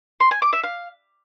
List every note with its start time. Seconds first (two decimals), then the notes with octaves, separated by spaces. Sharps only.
0.20 C6
0.31 G#5
0.42 D6
0.53 E5
0.63 F5